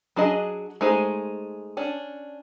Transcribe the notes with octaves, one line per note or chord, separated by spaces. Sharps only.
F#3 D4 G#4 D#5
G#3 A3 D#4 G#4 C5
C#4 D4